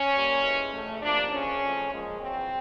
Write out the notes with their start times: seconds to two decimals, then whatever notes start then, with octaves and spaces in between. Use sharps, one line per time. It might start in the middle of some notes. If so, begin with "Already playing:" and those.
Already playing: C#4
0.13 A#2 G3 A#3
0.42 G#2 E3 G#3
0.72 F2 C#3 F#3 A3
1.01 C3 F3 A#3 D4
1.31 F#2 C#3 F3 C#4
1.61 F2 C#3 F3 A3
1.91 A#2 F3 G#3
2.19 E2 C#3 F#3 C4